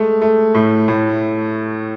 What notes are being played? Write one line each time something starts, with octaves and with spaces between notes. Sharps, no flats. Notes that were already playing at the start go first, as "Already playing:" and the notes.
Already playing: G#3 A3
A3
A2
A2